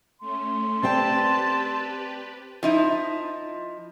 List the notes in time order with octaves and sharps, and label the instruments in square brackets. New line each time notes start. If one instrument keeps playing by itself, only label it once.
[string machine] A3 C#4 [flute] C6
[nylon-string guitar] C4 D5 G5 [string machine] G4 B4 [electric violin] A5
[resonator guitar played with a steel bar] F3 D#4 E4